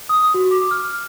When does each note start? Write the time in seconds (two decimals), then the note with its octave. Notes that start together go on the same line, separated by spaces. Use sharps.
0.09 D#6
0.34 F#4
0.51 D6
0.71 F6